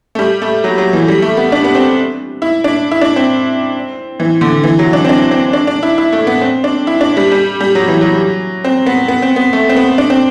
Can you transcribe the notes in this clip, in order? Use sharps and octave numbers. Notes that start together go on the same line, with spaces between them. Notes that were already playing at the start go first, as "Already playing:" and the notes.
A3
G3
A3
F#3
F#3
E3
G3
A3
B3
D4
B3
C4
E4
D4
E4
D4
C4
E3
D3
E3
F#3
D4
C4
D4
C4
D4
D4
E4
E4
A3
B3
C4
D4
E4
D4
G3
G3
G3
F#3
E3
F#3
C4
B3
B3
C4
B3
A3
C4
B3
D4
C4